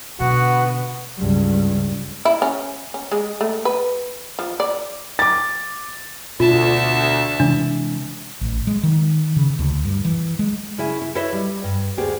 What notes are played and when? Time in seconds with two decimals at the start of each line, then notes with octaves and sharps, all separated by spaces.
0.20 B2 D3 B3 F#4 F#5
1.18 C#2 G2
2.25 E4
2.42 C#4
2.94 C#4
3.12 G#3
3.41 A3
3.65 B4
4.39 F3
4.60 D5
5.19 D6 A6
6.40 D2 B2 F4 E5 A5
7.40 C3 E3 G#3 D4
8.41 A1
8.67 G#3
8.83 D#3
9.36 C#3
9.59 D2
9.85 G2
10.05 E3
10.39 G#3
10.78 C#3 E4 E5 G#5
11.02 E4
11.15 E4 A4 B4 C#5 D#5 E5
11.33 G3
11.64 G2
11.97 D2 B3 G4 G#4